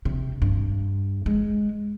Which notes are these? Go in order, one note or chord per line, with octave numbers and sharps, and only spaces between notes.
C3
G2
G#3